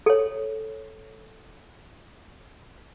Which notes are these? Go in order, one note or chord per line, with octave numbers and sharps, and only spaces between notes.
A4 C#5